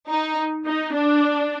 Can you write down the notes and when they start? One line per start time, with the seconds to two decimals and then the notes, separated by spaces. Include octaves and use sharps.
0.08 D#4
0.65 D#4
0.94 D4